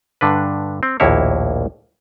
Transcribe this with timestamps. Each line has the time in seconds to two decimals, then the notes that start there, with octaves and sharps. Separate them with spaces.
0.21 G2 D3 D4 B4
0.83 C4
1.00 A#1 D#2 A2 A#3 E4 C#5